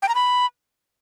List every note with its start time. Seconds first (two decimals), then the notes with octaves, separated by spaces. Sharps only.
0.02 G5
0.09 A#5
0.15 B5